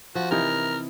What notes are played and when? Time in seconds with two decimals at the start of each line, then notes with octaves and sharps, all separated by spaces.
0.15 F3 F#4
0.31 C3 E3 D#4 A#4